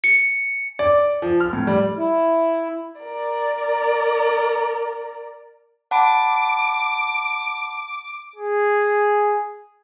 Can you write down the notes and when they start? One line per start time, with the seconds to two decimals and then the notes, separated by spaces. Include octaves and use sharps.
0.04 C#7
0.79 D5
1.22 F3
1.40 F6
1.53 A2
1.67 G3
1.97 E4
3.01 A#4 D5
5.91 F#5 A5 B5 D6
8.36 G#4